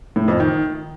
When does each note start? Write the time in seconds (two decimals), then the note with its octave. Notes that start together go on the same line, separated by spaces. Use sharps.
0.16 A2
0.28 F2
0.40 D#3